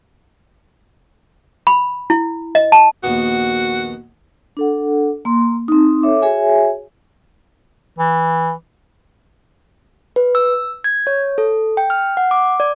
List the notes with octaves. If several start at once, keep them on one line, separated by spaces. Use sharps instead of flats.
B5
E4
D#5
A5
A#1 D#2 B3 F#4
D4 A4 F#5
A#3 C6
C4 D#4
A4 C#5 E5 D6
F#4 G#4 C#5 E5 G#5
E3
B4
E6
G#6
C#5
A4
G5
F6
F#5
D6
D5